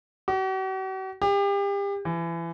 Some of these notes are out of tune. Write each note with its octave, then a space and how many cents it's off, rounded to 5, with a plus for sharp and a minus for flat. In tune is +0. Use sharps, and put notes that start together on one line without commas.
F#4 +45
G4 +35
E3 +30